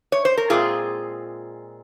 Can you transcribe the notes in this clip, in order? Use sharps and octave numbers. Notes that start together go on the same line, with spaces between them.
C#5
C5
A#4
A#2 G#3 C4 F4 G#4